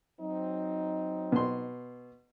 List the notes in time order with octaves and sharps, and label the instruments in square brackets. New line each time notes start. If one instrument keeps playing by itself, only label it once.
[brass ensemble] F#3 C4 D#4
[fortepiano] B2 C6